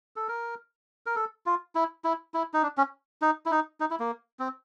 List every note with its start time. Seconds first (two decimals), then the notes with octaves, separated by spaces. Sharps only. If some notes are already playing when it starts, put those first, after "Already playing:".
0.16 A4
0.28 A#4
1.06 A#4
1.16 A4
1.46 F4
1.75 E4
2.04 E4
2.34 E4
2.54 D#4
2.63 D4
2.78 C#4
3.22 D#4
3.46 E4
3.51 D#4
3.80 D#4
3.91 E4
4.00 A#3
4.39 C4